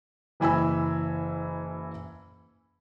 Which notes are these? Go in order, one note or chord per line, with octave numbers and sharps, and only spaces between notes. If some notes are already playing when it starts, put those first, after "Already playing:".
F#1 E3 G#5 B5 E6